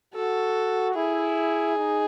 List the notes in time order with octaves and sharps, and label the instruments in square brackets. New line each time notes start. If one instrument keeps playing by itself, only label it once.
[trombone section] F#4 [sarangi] A4
[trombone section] E4 [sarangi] G#4
[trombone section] D#4